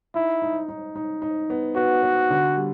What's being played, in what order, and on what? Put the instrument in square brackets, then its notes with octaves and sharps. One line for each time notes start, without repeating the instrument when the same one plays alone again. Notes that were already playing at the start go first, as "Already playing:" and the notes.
[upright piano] D#4 [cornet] E4
[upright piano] D#4
D#4
D#4
D#4
B3
[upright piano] B3 [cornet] F#4
[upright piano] B3
D3
G3